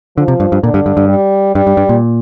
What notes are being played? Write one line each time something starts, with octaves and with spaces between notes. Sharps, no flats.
D3 F3
C3
G2
G2
A#2 D3
G2
G2
G2
G3
G2 G3
G2
G2
A#2